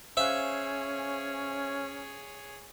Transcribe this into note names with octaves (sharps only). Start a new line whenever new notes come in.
C#4 G#4 C5 C#5 E5 F5 F#6